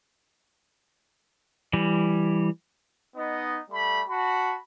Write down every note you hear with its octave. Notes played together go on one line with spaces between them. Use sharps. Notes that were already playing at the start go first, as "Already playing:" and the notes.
E3 G3
B3 D#4 D#5
G3 A3 B5
F#4 A5 B5